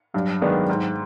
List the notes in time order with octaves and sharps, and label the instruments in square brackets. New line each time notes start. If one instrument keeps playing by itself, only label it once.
[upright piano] G2 [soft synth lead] F#3
[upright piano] D#3 G#3 B3 D4
G#2